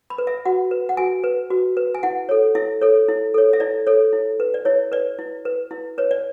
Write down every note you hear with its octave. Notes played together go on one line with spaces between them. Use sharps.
B5
B4
E5
F#4 F#5
B4
F#5
F#4 G#5
B4
F#4
B4
G#5
E4 F#5
A4 C#5
E4 E5
A4 C#5
E4
A4 C#5
E5
E4 D5
A4 C#5
E4
B4
D5
E4 C#5
B4 D5
E4
B4
E4
B4 C#5
D5